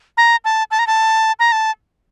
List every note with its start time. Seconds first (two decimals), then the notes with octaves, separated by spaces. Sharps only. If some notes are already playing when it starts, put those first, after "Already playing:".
0.17 A#5
0.45 A5
0.71 A5
0.79 A#5
0.87 A5
1.40 A#5
1.52 A5